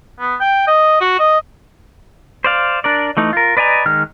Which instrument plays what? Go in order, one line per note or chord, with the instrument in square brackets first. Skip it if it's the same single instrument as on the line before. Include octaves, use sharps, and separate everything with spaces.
[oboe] B3
G5
D#5
F#4
D#5
[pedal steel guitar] C5 D5 F5
D4 A#4 D5
E3 A3 D#4
F4 A#4
B4 D5 D#5 G#5 A#5
D#3 G#3 F6